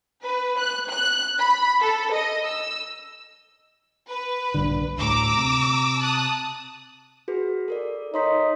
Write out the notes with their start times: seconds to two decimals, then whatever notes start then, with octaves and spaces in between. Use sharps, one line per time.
0.23 B4
0.59 F#6
0.91 F#6
1.39 B5
1.81 A4
2.12 D#5
2.46 E6
4.08 B4
4.54 A#1 G2 D3
4.98 D2 A2 A#5 D6 E6
5.37 C3
6.00 A5 D#6 F#6
7.28 F#4 G#4 B4
7.68 A4 A#4 D5
8.14 D#4 C#5 C6 B6